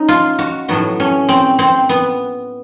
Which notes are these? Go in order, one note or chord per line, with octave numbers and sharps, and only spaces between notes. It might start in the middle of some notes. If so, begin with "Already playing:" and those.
Already playing: C#4 D#4
F4
F#4
A2 F#3 B3 F#4
C#4
C4
C4
B3